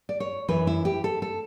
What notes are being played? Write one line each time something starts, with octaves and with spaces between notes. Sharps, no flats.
D5
C#5
F#2 E3 B4
E4
G4
A4
A4